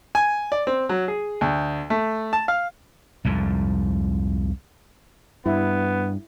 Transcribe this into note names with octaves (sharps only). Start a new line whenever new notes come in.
G#5
D5
C4
F#3
G#4
D2
A3
A5
F5
C2 F2 G#2
G2 B3 E4